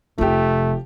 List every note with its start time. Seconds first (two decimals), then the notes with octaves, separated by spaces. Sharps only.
0.18 F1 C3 F3 A3 G4